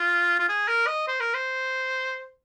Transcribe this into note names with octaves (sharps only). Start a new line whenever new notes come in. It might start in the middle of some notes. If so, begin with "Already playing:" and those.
Already playing: F4
F4
G#4
A#4
D#5
C5
A#4
C5